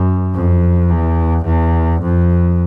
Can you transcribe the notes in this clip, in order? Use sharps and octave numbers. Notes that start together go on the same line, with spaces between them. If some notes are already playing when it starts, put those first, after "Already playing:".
Already playing: F#2
F2
E2
E2
F2